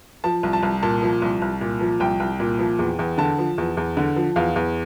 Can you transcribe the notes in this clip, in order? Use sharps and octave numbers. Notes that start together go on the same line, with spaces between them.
F3 A5
C2
A5
C2
A#2 A5
F3
C2
C2
A#2
F3
C2 G5
C2
A#2
F3
E2
E2
D3 A5
F3
E2
E2
D3
F3
E2 F5
E2